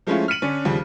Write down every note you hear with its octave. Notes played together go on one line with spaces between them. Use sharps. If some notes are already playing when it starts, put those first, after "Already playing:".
F3 G#3 A3 C#4 E4 F4
F6 B6 C#7 D#7 F#7
D3 C#4 D4
D#2 C#3 F3 G3